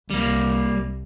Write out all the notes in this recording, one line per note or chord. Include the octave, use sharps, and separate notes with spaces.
C2 G3 A#3